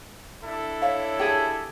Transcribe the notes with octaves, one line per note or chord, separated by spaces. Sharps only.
D4 E4 A4
C#5 F5
G4 G#4 A5